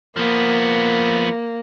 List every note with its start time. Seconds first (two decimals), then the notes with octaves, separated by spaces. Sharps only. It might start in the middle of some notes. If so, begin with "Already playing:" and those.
0.17 F3 A#3 B3